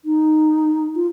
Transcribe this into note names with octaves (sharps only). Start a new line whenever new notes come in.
D#4
F4